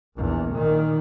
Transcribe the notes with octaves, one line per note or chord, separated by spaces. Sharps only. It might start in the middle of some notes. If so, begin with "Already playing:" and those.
A#1 E2
A#2 D#3